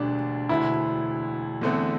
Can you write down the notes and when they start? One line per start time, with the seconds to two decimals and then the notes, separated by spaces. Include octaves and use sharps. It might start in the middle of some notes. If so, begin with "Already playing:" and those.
Already playing: E1 D2 D3 G3 D4
0.49 E1 D2 D3 E4
1.61 E2 D3 A3 C4